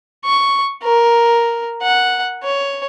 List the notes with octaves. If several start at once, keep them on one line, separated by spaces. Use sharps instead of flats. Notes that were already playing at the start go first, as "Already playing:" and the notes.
C#6
A#4
F#5
C#5